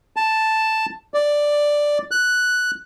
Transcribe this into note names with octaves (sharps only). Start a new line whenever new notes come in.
A5
D5
F#6